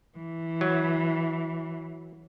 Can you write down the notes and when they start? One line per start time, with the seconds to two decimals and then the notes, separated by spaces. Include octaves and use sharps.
0.18 E3
0.61 F#3